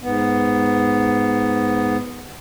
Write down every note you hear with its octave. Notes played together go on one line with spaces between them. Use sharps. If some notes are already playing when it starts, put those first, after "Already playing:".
G#2 B3